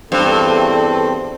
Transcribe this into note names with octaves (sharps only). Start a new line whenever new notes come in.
E2 G2 C4 A4